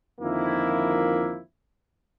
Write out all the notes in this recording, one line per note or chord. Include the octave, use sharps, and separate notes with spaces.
F2 D3 D#3 F3 A#3 E4